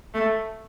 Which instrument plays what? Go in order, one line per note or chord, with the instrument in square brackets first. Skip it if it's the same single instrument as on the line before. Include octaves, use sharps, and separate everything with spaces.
[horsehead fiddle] A3